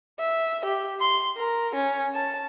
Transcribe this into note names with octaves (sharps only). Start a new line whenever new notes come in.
E5
G4
C6
A#4
C#4
A5